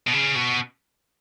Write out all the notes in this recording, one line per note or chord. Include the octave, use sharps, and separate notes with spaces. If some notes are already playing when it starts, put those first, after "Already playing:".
B2
C#3
B2